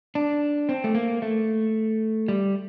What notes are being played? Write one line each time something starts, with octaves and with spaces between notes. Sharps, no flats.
D4
C4
A3
A#3
A3
G3